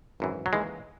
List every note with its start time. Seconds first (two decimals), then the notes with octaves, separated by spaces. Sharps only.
0.20 G#1 F#2 E3
0.46 F#3
0.53 D#2 C#3 E3 G#3